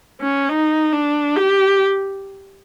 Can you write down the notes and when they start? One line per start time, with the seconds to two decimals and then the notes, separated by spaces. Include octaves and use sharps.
0.21 C#4
0.49 D#4
0.93 D4
1.36 G4